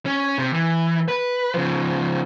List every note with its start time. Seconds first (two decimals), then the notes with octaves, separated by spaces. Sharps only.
0.06 C#4
0.38 C3
0.53 E3
1.08 B4
1.54 C#3 F3